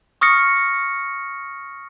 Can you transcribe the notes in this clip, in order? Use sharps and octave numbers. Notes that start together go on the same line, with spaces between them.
C#6 D#6 F6 A#6 C#7